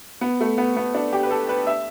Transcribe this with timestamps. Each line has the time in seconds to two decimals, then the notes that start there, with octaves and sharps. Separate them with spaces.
0.21 B3
0.41 A3
0.58 B3
0.77 B3
0.95 D4
1.13 G4
1.23 B4
1.31 A4
1.49 B4
1.67 E5